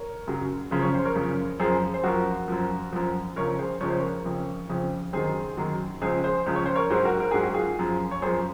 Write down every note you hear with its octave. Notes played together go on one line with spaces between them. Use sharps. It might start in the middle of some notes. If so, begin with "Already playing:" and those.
Already playing: A#4 C#5
F#2 C#3 F#3
F#2 C#3 F3
C#5
C5
A#4 C#5
F#2 C#3 F3
F#2 F3 G#4 C5
C5
F#2 F3 F#4 A#4
F#2 F3
F#2 F3
C#2 C#3 F3 A#4 C#5
G#4 C5
C#2 C#3 F3 C#5
C5
A#4 C#5
F2 C#3 F3
F2 C#3 F3
F#2 D#3 F#3 G#4 C5
F#2 D#3 F#3
C#2 C#3 F3 G#4 C5
G#4 C5
C#2 C#3 F3
C#5
C5
A#4 C#5
G#2 F#3 G#4 C5
F#4 A#4
A#4
G#2 F#3 G#4
F#4
F4 G#4
F#2 F3
C#5
F#2 F3 G#4 C5